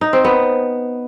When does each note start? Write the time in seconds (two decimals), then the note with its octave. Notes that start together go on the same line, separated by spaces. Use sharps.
0.01 D#4
0.13 C4
0.25 B3